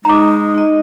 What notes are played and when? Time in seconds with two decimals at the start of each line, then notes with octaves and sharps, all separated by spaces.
0.05 G#3 D#4 A#5 D6
0.54 D#4 D#5